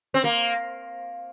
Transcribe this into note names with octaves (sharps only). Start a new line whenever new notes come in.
C4
A#3